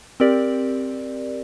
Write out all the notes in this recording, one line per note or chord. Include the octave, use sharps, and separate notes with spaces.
C4 G4 A#4 D5